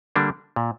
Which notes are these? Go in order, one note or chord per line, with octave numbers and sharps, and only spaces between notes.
D3 G3 A#3 D4
A#2